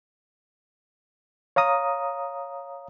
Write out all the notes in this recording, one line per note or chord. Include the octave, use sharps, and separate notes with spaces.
C#5 F5 A#5 D#6